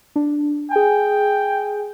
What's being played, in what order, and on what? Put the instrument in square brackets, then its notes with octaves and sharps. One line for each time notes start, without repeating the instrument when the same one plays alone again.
[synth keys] D4
[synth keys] G#4 G#5 [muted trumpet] G5